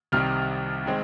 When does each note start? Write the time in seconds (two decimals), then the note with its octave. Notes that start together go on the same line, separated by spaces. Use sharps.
0.12 C2 C3 D#3 G3 F6
0.86 D#3 G#3 C4